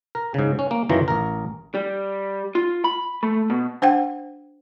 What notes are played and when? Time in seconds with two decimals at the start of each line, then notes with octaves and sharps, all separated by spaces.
0.15 A#4
0.34 G#2 C#3
0.59 C#4
0.71 A#3
0.89 F#2 D#3 E3 F4 A#5
1.08 A1 A#4
1.75 G3
2.55 F4
2.84 B5
3.23 A3
3.50 B2
3.82 D4 C5 F#5 G5